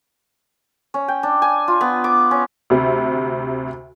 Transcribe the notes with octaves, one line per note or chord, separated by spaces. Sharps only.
C#4
G5
D4
G#5
F4
B3
D6
C#4
D2 C3